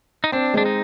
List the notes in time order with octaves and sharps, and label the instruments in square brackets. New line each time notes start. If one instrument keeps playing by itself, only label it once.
[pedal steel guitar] D#4
[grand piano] C4 [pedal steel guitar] D4
[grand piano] G#3 [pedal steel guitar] D4
[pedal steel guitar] D#4